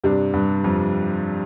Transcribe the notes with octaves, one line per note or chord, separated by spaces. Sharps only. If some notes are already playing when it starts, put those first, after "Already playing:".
G2 C3 G3 D4
G2
F2